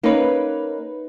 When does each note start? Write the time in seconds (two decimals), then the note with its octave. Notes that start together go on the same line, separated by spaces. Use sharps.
0.03 A#3 C#4 D#4 B4